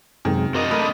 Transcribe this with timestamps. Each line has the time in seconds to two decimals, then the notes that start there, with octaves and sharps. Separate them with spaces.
0.25 F#2 C3 D#3 G#3
0.55 C4 D4 F#4 A#4 D#5
0.71 A3 A#4 B5 D#6